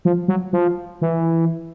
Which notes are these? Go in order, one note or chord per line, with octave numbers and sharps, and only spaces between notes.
F3
F#3
F3
E3